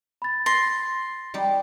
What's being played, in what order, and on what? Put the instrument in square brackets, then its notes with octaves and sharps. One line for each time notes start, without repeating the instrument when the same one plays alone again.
[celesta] B5 A6
[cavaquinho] C6 [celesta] A6 A#6 C7
[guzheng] G3 D#4 D5